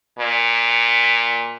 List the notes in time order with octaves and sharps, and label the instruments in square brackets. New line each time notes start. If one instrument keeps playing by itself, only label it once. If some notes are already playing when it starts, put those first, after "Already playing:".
[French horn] A#2